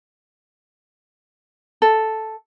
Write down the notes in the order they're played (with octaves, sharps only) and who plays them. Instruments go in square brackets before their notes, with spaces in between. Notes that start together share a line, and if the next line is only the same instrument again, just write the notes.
[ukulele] A4